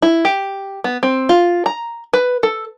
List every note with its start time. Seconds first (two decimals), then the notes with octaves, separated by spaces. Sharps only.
0.02 E4
0.25 G4
0.84 B3
1.03 C4
1.29 F4
1.66 A#5
2.13 B4
2.43 A4